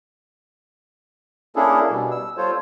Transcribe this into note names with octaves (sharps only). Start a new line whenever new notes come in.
A#3 C#4 D4 E4 G#4 A4
B2 G3
E6
G3 F4 A4 C5 C#5